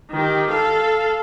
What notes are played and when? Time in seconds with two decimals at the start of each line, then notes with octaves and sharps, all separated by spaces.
0.11 D#3 G4
0.50 A4 F5